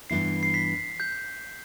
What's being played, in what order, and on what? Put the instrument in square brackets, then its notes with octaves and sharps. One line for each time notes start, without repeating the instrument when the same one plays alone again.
[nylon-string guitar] G2 E3 B3 E4 [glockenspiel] C7
[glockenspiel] C7
B6
G6